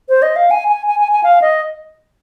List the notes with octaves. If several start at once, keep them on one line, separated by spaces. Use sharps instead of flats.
C5
D#5
F5
G#5
G#5
G#5
G#5
G#5
F5
D#5